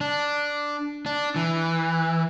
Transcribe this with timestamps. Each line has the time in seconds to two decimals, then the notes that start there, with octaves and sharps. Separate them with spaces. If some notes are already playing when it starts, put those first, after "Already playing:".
0.01 D4
1.06 D4
1.36 E3